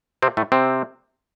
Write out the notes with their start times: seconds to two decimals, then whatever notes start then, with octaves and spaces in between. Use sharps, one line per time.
0.22 C3 C4
0.37 A2 A3
0.52 C3 C4